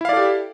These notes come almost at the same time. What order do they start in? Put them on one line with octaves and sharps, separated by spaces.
E4 F5 D5 A4 G4